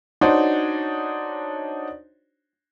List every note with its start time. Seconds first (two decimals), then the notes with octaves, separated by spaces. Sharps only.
0.21 D4 D#4 F#4 C5 C#5